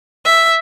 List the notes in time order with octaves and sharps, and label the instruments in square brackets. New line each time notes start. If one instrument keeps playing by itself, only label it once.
[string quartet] E5